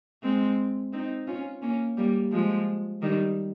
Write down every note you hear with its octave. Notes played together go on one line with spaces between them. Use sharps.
G#3 C4
C4 D#4
C#4 F4
A#3 C#4
G3 A#3
F3 G#3
D#3 G3